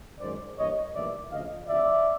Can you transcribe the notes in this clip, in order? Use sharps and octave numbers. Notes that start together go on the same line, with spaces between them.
F#2 D#3 G#3 C5 D5
G2 E3 G3 A#3 C#5 D#5
B1 A2 E3 G3 A#3 D5 E5
D2 C#3 F3 D#5 F5
D2 C3 F3 D5 E5